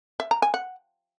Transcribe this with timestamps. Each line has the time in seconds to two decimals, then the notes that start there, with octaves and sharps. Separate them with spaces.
0.20 E5
0.31 A#5
0.42 G#5
0.54 F#5